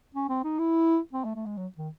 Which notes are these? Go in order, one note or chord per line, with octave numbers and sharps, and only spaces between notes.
C#4
C4
D#4
E4
C4
A3
A3
G#3
F#3
D#3